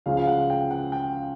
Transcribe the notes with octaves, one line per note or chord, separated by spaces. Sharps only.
C#2 C#3 F3 G#3 C#4 F5
F5
F#5
G5
F#5
G5